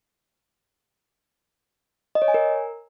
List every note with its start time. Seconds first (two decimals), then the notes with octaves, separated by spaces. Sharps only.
2.15 D#5
2.22 C#5
2.28 G#5
2.34 A#4